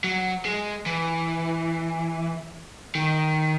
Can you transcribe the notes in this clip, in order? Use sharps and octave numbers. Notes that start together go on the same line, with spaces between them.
F#3
G#3
E3
D#3